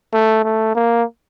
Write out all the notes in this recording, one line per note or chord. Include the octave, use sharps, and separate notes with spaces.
A3
A3
A#3